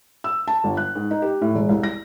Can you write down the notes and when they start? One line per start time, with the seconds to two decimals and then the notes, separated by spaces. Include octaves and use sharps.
0.24 E6
0.48 A5
0.64 G1
0.77 F#6
0.95 G#2
1.11 D#4
1.22 G4
1.42 A2
1.55 E1
1.69 C2
1.83 A#6